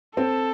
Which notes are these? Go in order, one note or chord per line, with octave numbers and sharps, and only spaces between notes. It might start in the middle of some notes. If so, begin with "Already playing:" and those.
C4 A4